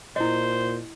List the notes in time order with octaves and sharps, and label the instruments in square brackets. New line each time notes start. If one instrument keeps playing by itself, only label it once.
[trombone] A#2 [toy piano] E4 D#5 [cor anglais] C5